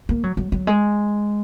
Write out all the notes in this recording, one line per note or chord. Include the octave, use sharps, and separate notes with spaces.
A#3
F#3
F#3
F#3
G#3